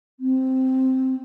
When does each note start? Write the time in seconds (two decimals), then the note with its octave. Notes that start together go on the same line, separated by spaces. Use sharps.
0.20 C4